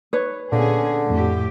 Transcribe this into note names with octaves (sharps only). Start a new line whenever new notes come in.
D#4 B4 C#5 D5
A#2 D3 A#3 B3 C#4 G#4
F2 A2 G4